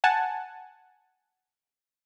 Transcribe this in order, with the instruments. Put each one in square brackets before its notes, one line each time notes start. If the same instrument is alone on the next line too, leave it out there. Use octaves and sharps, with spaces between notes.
[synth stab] F#5 G#5 A5